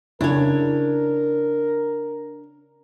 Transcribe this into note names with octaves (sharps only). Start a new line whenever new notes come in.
C#3 D4 E4 A#4 C#5